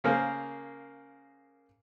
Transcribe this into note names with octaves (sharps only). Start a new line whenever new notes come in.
C#3 A#3 G#4 A#4 C5